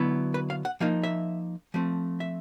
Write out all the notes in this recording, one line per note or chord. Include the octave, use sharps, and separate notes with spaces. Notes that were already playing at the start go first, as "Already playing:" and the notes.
Already playing: D3 F#3 B3 E4
B4
F5
F#5
F3 A#3 D#4 F5
E5
F3 A3 C4
E5